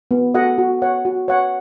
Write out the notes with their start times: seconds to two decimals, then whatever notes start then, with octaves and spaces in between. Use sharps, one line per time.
0.11 B3
0.34 F#4 A4 D#5 F#5
0.58 F#4
0.82 C#5 F#5
1.05 F#4
1.28 C#5 F#5